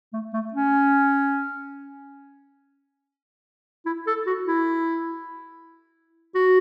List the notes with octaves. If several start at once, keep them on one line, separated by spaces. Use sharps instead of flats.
A3
A3
C#4
E4
A4
F#4
E4
F#4